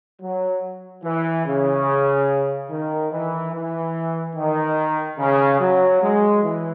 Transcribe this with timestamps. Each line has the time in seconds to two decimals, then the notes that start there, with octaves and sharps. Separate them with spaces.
0.21 F#3
1.04 E3
1.46 C#3
2.70 D#3
3.12 E3
3.53 E3
4.36 D#3
5.19 C#3
5.60 F#3
6.02 G#3
6.43 E3